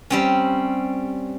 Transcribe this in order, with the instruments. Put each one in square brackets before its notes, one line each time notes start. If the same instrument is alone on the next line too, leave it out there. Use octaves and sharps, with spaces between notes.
[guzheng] G3 C4 C#4